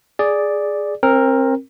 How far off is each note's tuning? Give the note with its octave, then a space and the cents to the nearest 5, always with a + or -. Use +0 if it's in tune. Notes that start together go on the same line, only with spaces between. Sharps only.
G#4 +0 D5 +0
C4 +30 A#4 +0